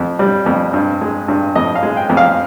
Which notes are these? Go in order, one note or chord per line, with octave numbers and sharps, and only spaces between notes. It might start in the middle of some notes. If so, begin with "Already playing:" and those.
Already playing: F2
G3
F2
G2
G#3
G2
F2 D#5
F5
G#3
G5
F2
F5